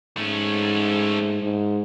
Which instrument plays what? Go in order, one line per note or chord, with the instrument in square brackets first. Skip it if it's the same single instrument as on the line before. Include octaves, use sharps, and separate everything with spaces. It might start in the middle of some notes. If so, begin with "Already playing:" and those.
[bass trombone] G#2 [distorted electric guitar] A3 C#4
[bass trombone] G#2